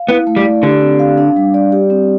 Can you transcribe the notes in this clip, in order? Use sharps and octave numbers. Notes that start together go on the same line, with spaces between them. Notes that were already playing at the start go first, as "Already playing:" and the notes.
Already playing: F5
B3 E4
A3
G3
D5
D3 G4
C4
F5
D4
G3
D5
G4
C4